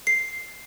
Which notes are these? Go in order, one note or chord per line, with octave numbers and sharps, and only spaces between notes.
C7